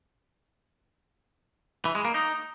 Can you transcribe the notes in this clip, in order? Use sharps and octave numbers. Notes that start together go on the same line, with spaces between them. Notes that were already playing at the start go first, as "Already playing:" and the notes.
E3
G#3
A#3
D#4